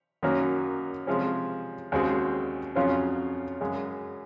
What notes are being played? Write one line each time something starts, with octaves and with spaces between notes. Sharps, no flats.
F#2 D#3 A#3 C#4 F#4
C3 F3 G#3 C#4
D#2 C#3 G#3 C4 F#4
F2 C#3 F#3 C#4 F4
F#2 C#3 G#3